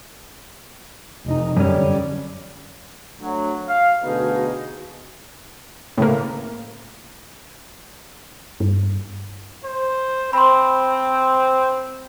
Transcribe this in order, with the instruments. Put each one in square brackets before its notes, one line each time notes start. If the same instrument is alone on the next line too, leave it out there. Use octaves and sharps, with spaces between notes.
[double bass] F1 D#4
[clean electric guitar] F#2 C#4 [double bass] D3 G3
[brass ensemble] D2 F#3
F5
D2 B2 D#4 G#4
[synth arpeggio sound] A2 C#3 A#3
[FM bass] G2
[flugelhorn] C5
[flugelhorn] C4 [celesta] B5 C6